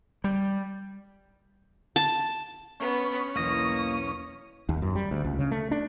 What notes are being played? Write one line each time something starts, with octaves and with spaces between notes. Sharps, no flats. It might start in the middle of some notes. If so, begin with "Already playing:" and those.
G3
A5
B3 C#4 D4
B1 E2 A#3 D#5 F#5 D#6
D#2
F#2
G3
D2
C#2
C#3
A3
D4